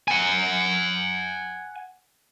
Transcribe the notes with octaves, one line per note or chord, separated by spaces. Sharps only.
F#5 G#5